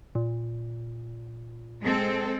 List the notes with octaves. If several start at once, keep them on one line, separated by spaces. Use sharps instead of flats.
A#2
G#3 C4 A4